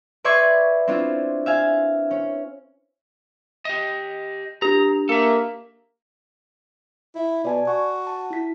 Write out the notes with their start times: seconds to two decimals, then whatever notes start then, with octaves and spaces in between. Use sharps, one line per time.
0.24 B4 D5 E5 C6 C#6 G#6
0.88 C4 D4 E4 F4
1.46 E5 F5 G#5
2.11 C#4
3.65 G4 D#5
4.62 D4 G4 A#5
5.09 A#3 A4 E5
7.16 E4
7.45 B2 D5 G#5 A5
7.67 F#4 C#6
8.07 A5
8.30 E4 B6